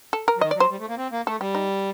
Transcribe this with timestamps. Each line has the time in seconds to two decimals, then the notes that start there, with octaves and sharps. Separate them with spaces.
0.13 A4
0.28 A#4
0.36 F#3
0.41 D#3 D#5
0.51 D5
0.55 F#3
0.60 C5
0.70 G3
0.79 A3
0.89 A#3
0.98 C4
1.12 A#3
1.27 A3 A4
1.41 G3 G4
1.55 D#4